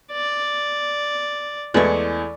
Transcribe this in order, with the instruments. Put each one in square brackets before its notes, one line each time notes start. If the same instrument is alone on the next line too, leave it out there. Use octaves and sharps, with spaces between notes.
[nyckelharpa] D5
[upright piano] E2 E3 [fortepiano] G#3 A3 [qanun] D5 C#6